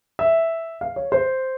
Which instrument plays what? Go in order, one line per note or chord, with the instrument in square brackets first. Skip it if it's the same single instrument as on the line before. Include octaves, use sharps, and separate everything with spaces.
[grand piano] E5
F5
C#5
C5